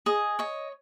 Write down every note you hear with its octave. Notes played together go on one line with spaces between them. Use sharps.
G#4 D#5
C#5 D#5